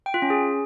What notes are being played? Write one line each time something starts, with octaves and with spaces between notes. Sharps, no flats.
G5
F4
C#4
G#4